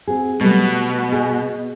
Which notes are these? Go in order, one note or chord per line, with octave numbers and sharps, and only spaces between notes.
C4 F#4 G#4
B2 F#3 G3 A3
G#4 D#5